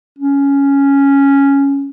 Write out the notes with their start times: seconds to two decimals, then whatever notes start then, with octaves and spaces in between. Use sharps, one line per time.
0.19 C#4